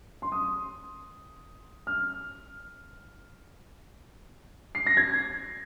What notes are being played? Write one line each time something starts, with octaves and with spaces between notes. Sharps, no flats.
C6
D#6
F6
C7
A#6
G#6